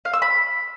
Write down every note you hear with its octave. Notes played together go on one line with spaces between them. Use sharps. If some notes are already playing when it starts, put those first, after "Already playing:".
F5
E6
B5